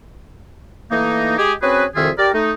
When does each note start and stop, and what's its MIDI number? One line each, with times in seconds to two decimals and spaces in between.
0.91 1.36 52
0.91 1.36 57
0.91 1.36 58
0.91 1.36 63
1.38 1.52 56
1.38 1.52 67
1.38 1.52 68
1.61 1.85 60
1.61 1.85 61
1.61 1.85 66
1.61 1.85 68
1.61 1.85 71
1.95 2.10 36
1.95 2.10 41
1.95 2.10 51
1.95 2.10 65
1.95 2.10 68
1.95 2.10 76
2.18 2.29 67
2.18 2.29 70
2.18 2.29 74
2.34 2.53 57
2.34 2.53 63